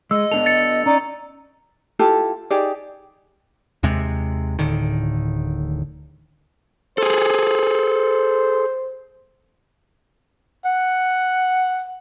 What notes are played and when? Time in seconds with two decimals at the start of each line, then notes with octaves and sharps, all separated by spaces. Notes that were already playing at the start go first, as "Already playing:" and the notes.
0.11 G#3 D#5 E6
0.32 B3 D4 A4 F7
0.46 A6 C#7
0.86 C#4 D#4 D5
1.99 E4 F4 G4 A4
2.50 D#4 G4 G#4 D5
3.83 D#2 C3 G#3
4.59 D1 A2 D3 D#3
6.98 G#4 A4 C5
10.66 F#5